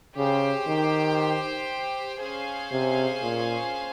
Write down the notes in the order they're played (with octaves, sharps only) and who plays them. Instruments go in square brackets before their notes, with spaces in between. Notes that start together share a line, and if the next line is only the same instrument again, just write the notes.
[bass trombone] C#3 [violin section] G4 C5 G5
[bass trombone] D#3
[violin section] C#4 G#4 C5 F5 G#5
[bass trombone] C3
A#2